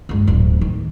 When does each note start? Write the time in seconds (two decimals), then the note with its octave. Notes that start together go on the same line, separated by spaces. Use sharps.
0.09 C#2 G2
0.27 D1
0.61 D#3